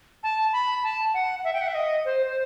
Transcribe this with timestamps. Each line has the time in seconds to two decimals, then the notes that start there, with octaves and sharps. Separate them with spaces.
0.23 A5
0.53 B5
0.84 A5
1.14 F#5
1.44 E5
1.53 G5
1.61 F#5
1.68 E5
1.75 D#5
2.05 C5
2.26 C5